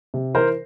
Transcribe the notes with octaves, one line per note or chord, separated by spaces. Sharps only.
C3
E3 A#4 C5